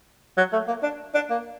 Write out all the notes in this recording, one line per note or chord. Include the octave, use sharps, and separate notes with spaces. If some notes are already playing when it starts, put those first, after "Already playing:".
F#3
A3
A#3
D4
D4
A#3